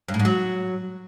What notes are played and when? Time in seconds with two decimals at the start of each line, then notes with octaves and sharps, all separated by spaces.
0.08 G2
0.14 A2
0.19 G#2
0.25 F#3